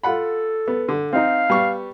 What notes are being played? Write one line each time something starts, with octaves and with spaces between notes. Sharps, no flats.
F4 A4 F#5 B5
B3
D3
C4 D#4 F5
G3 B3 C#6